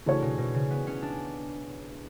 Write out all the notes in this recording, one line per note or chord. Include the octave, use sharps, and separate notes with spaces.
C#3 E3 A3 D4 F#4 C#5
B2
B2
C#3
B3
C#4
D4